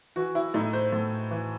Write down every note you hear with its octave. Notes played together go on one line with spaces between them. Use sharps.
E3 F#4
E4
A2 D#4
C5
A2
E3